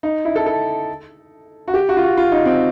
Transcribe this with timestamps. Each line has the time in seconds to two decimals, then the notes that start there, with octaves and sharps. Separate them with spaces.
0.03 D#4
0.25 E4
0.36 A4
0.46 A4
1.68 F#4
1.74 G4
1.89 F#4
1.97 F4
2.03 F#4
2.17 F4
2.32 D#4
2.46 C4